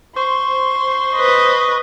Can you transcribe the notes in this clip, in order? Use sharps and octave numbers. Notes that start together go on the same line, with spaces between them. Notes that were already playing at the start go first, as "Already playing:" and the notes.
C5 C6 C#6
B4 D#5